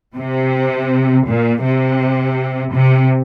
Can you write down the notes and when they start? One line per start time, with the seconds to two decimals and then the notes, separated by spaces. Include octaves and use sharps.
0.16 C3
1.26 A#2
1.63 C3
2.73 C3